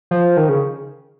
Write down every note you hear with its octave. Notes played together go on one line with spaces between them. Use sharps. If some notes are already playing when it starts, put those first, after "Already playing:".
F3
D#3
C#3